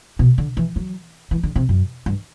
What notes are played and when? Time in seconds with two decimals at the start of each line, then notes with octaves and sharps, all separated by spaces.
0.19 B2
0.38 D3
0.57 E3
0.76 F#3
1.31 E3
1.43 D3
1.56 C3
1.69 F#2
2.06 G2